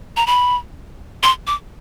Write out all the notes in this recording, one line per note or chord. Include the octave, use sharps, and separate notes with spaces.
A#5
B5
C6
D6